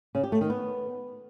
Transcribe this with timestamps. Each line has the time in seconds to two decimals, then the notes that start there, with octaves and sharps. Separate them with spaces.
0.15 C#3
0.23 G4
0.32 A3
0.41 D#3
0.50 B3